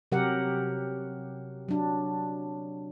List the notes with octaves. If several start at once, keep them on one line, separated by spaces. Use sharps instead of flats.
C3 F#3 G4 A#4 F#5
F#3 D4